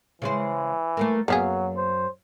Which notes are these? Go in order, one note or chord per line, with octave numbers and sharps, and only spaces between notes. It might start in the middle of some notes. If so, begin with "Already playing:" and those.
C#3 E3 G#3 C5
A3 A#3 A#4
F#2 F#3 A#3 B3 G#4 F5
C5